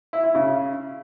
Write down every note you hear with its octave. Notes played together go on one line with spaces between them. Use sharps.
E4
E4
C#3